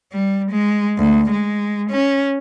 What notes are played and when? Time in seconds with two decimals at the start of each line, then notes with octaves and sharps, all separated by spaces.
0.13 G3
0.51 G#3
0.99 D2
1.32 G#3
1.90 C#4